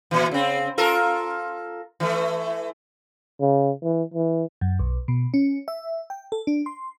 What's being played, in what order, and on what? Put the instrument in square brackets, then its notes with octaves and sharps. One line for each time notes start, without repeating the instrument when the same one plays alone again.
[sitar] A#2 E3
C#3 C4
F4 A4 A#4
E3 A3
[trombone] C#3
E3
E3
[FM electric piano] F#2
B1
B2
C#4
E5
G5
A4
D4
C6